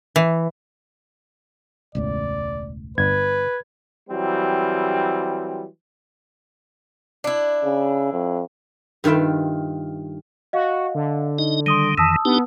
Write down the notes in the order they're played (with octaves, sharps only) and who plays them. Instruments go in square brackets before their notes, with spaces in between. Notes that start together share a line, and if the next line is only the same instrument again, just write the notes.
[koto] E3
[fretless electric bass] E1 C#2 A2 [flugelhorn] D5
[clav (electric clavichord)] G1 [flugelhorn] B4 [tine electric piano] G#6
[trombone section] E3 F#3 G3 C4
[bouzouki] D4 E4
[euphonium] C#3
F2
[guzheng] G2 D#3 F4 E5 G5
[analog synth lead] F#4 [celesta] D#5 F5
[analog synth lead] D3
[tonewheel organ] D#4 D#5
[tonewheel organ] D#3 G3 [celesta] C6 D#6 D#7
[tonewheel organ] F2 D#3 E3 [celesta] A5 D#6 E6
[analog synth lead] B3 [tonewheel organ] D4 D#4 G4